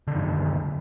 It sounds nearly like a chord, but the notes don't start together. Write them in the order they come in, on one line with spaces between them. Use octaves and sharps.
D3 D#3 F#2